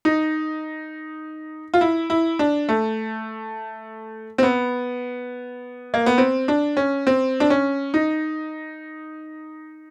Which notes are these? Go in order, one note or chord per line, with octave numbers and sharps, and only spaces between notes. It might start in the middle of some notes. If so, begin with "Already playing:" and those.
D#4
F4
E4
E4
D4
A3
C4
B3
A#3
B3
C4
D4
C#4
C4
D4
C#4
D#4